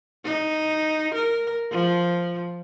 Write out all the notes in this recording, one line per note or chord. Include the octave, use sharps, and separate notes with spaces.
D#4
A#4
F3